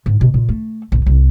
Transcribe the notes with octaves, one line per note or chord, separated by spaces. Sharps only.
G#2
B2
A#2
A3
A#1
C2